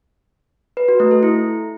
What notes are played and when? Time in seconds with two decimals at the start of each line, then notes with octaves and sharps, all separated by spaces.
0.77 B4
0.88 F#4
1.00 A3
1.11 A4
1.23 E4